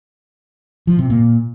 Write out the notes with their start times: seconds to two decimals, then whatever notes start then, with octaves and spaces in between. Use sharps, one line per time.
0.87 F3
0.99 C3
1.10 A#2